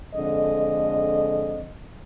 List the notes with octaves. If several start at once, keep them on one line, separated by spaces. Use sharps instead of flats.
F2 D3 G#3 D#5